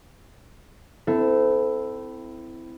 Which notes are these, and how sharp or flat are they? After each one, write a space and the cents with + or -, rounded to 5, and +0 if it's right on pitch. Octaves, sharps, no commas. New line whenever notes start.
C4 -30 E4 +0 A4 +0